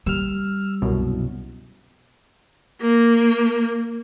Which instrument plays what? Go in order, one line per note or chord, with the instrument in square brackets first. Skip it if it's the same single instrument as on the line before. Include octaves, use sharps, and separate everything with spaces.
[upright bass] G3 [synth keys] E6 F6
[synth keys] C2 F#2 B2
[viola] A#3